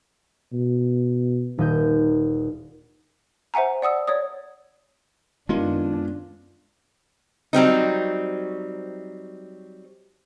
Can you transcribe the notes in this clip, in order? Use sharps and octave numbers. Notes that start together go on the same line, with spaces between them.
B2
D#1 D#3 D#4 G6
C5 E5 F#5 G#5 A#5
D5 F#5 D#6 E6
C#5 D5 D#6
F#2 D#3 G#3 B3 C#4 D4 F4
F#3 G3 C4 D#4